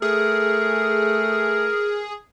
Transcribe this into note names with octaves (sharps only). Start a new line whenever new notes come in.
A3 G#4 A#4